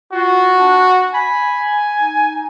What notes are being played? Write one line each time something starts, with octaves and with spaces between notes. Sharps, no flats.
F4 F#4
D4
G#5 B5
D#4